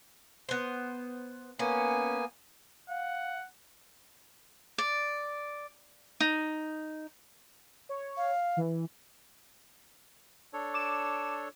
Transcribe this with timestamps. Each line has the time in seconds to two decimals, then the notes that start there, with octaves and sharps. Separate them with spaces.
0.49 B3 C5
1.59 A#3 B3 C#4 G#5
2.89 F5 F#5
4.78 D5
6.20 D#4
7.89 C#5
8.17 F5
8.57 E3
10.53 D4 A4 C#5
10.74 D6 E7